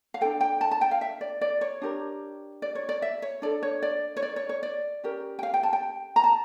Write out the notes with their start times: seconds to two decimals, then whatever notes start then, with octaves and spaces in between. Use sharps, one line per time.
0.14 F5
0.21 D4 F4 A4 G5
0.41 G5
0.61 A5
0.71 A5
0.81 G5
0.91 F5
1.01 E5
1.21 D5
1.41 D5
1.61 C#5
1.82 D4 G4 A#4
2.62 D5
2.75 C#5
2.89 D5
3.02 E5
3.22 C#5
3.42 D4 A4 D5
3.63 C#5
3.82 D5
4.17 C#5
4.22 D5
4.36 C#5
4.49 C#5
4.63 D5
5.04 C#4 G4 A#4
5.39 G5
5.43 F5
5.54 G5
5.63 A5
5.73 G5
6.16 A#5
6.24 A5